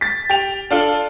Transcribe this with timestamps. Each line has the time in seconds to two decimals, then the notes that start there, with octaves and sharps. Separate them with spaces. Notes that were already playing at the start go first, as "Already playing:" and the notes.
0.01 A6 B6
0.30 G4 F7
0.71 D4 F4 A4